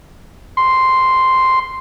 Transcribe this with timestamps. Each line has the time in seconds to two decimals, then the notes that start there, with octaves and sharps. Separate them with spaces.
0.57 C6